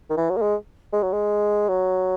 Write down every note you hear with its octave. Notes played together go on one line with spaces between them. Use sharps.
D#3
E3
F#3
A#3
G#3
G#3
F#3
G#3
F#3